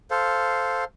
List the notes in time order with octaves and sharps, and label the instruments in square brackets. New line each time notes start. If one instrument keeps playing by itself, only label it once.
[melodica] A4 C5 F5